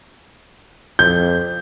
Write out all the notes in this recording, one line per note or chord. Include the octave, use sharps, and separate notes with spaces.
F2 G6